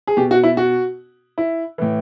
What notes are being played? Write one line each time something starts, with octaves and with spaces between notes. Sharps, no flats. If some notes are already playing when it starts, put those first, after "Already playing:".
G#4
B2 G4
F#4
E4
F#4
E4
A2 E3